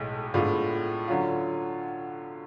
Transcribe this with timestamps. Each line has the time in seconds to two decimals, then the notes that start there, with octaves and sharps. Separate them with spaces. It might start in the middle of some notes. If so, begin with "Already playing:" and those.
Already playing: B1 A2 G#3
0.34 A2 G#3 B3 D4 F4
1.08 D3 F#3 C#4 F4